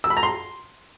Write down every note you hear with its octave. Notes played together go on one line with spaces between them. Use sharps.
E6
B5
A#5
C6